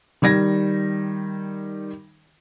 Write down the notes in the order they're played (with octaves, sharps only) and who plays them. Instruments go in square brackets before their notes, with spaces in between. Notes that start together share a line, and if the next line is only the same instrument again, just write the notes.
[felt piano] D#3 G3 G#6 A#6